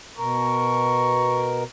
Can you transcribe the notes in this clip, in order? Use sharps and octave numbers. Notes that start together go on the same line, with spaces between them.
B2 A#4 C#6